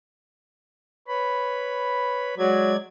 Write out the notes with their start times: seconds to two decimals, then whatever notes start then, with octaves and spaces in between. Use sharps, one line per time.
1.08 B4 C#5 B5
2.38 F#3 G#3 D5 G#6